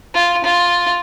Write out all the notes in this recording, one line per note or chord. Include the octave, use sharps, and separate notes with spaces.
F4
F4